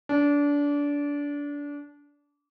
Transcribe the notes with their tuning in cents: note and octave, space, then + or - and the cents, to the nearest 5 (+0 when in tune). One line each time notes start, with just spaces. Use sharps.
D4 -25